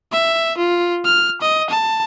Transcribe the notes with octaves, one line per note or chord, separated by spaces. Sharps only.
E5
F4
F6
D#5
A5